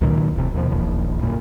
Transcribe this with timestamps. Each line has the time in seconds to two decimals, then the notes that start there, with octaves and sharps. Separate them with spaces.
0.01 C#2 A#2 D#3 F#3
0.36 E1 C3
0.54 D#2 B2 D#3 F3
0.70 D#1 A#1 E2 F3
1.23 G1 F#2 A#2